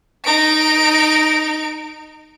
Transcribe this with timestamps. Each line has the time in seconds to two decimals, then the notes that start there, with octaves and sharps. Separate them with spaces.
0.24 D#4 D7